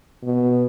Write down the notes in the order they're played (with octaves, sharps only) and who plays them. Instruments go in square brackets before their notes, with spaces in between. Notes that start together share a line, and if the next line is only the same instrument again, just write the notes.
[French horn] B2